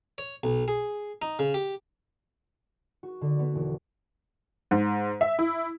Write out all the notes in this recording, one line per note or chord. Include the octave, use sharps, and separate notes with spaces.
C#5
B1
G#4
D#4
C#3
G4
F#4
D3
B3
E1
G#2
E5
E4